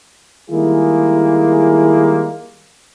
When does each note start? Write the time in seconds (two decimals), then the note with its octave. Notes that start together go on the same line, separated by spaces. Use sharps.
0.50 D#3 G3 G#3 A#3 E4 G#4